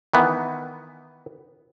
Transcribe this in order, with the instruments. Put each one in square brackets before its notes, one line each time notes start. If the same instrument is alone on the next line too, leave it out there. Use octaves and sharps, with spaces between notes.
[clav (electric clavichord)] D#3 E3 B3